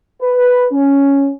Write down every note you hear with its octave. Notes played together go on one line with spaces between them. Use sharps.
B4
C#4